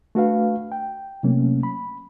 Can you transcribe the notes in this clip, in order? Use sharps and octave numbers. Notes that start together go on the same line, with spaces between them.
A3 D4 F#4 A4 B4 F5
G5
C3 F#3 A3 A#3 C#4
B5